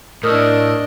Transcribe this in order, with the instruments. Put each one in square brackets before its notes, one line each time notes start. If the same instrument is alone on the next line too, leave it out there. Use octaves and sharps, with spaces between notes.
[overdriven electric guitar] A2 [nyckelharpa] D4 D#5 [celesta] A#4 D#6 F6